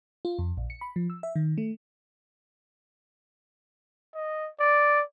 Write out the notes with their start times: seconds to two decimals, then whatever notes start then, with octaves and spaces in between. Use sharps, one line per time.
0.25 F4
0.39 F2
0.57 A#1
0.70 C#7
0.81 B5
0.96 F3
1.10 E6
1.23 E5
1.36 D#3
1.58 A3
4.15 D#5
4.60 D5